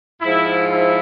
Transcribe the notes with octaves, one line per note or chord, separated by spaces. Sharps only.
G#2 F3 E4
E4